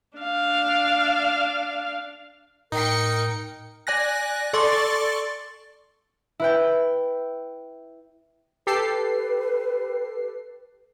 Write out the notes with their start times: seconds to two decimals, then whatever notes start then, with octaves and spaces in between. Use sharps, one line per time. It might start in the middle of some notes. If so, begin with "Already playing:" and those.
0.18 D4 F5
2.72 A2 D#4 A#4 G5 C#7
3.87 D5 G#5 F#6 A#6
4.53 A4 D5 C6 C#6 A6
6.40 E4 B4 G5
8.67 G4 A4 B4 C7